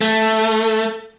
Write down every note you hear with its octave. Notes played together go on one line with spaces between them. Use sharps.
A3